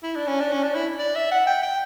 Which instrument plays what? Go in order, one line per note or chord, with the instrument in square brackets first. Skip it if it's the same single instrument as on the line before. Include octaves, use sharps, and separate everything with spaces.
[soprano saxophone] E4
D4
C#4
D4
C#4
D4
E4
D5
E5
F#5
G5
G5